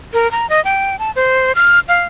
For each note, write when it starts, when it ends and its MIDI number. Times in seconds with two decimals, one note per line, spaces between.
0.14 0.30 70
0.31 0.49 82
0.50 0.63 75
0.65 0.98 79
0.99 1.11 81
1.16 1.52 72
1.55 1.80 89
1.88 2.04 77